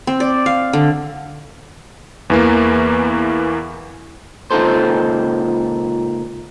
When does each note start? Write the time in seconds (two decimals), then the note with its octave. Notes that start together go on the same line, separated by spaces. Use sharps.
0.07 C4
0.20 D5
0.46 F5
0.73 D3
2.30 E2 E3 A#3
4.51 C#2 A#2 F3 D#4 A4 C5